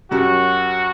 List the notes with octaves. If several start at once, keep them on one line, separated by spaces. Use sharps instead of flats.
F#2 C#4 F#4 G4